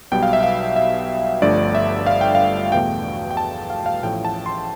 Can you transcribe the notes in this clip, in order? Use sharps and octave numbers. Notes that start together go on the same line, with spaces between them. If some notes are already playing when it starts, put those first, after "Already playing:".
B1 B2 G3 G5
F5
E5
F5
E5
G1 G2 D3 F3 A3 D5
E5
F5
G5
F5
E2 B2 A3 G5
G5
A5
F5
F5
A1 A2 F3 A3 G5
A5
C6